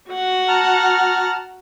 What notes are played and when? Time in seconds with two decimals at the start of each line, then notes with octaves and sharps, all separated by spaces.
0.10 F#4 F#5
0.48 A5 A#5 F6